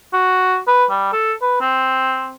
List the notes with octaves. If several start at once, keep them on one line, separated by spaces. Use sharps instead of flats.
F#4
B4
G3
A4
B4
C4